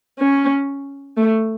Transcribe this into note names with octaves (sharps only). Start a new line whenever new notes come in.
C#4
A3